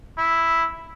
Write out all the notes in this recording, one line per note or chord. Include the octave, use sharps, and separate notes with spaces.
E4